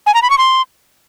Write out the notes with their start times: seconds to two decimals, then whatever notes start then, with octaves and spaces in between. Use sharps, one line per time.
0.07 G#5
0.14 A#5
0.22 B5
0.30 C#6
0.38 C6